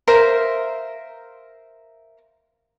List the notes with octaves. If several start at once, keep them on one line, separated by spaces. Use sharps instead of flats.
A#4 C5 E5 F5